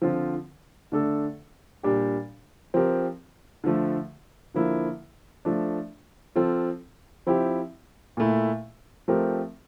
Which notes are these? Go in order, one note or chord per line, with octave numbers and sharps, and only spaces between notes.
D3 F3 C4 F4
D3 A3 D4 A4
A#2 G3 D4 G4
F3 C4 G4 A#4
D3 F3 A3
D3 F3 A#3 E4
F3 A3 D4
F3 C4 F4 A4
F3 C4 E4 G4
A#2 A3 E4
F3 A3 C4 G4 A#4